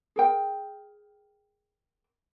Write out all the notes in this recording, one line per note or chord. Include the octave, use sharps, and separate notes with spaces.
G#4 A#4 G5